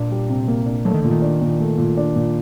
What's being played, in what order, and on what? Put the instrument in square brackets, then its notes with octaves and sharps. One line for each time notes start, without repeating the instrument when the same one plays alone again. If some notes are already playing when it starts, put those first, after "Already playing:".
Already playing: [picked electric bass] A#2 [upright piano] D4
[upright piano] G3
C3
A#3
D4
[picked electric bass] F#3 [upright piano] A3
[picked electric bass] D#3
[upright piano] A#2 [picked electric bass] D3
[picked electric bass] D#3
[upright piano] D4
A#2
A3
A#2
D4
A#2